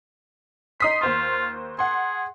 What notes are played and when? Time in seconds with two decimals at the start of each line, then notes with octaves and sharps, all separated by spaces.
0.80 D#4 C6 D#6 B6
1.01 D#2 F4 C5 C6
1.79 G#4 F#5 C6